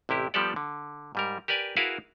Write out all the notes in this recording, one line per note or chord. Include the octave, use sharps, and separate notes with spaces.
A1 C3 E4 G4
F3 G3 B3 G4 A4 D5
D3
G#2 G3 A#4
G4 A#4 B4 D5 G#5
E4 F#4 G#4 A#4 B4 F5